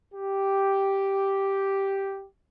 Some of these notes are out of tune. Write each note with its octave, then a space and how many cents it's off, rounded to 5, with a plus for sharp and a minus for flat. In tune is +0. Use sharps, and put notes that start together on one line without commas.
G4 -5